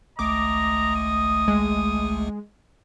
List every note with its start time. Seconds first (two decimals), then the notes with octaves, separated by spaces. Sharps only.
0.19 G#1 C#2 A3 D#5 A#5 D6
0.96 D#6
1.48 G#3